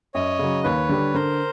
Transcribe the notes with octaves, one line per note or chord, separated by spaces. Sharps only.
F#2 C#5 D#5
C#3 F#3
D#2 B4 C#5
D3 G3
D3 A#4 C5